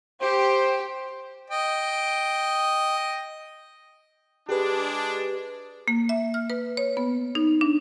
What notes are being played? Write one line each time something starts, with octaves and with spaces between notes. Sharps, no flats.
G4 C5
D#5 G5
G#3 D4 G4 G#4 B4
A#3
E5
F6
B4
C#5
B3
D#4
D4